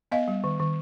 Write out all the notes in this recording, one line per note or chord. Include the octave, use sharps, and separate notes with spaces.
B3 D#5 F5
G3
D#3
D#3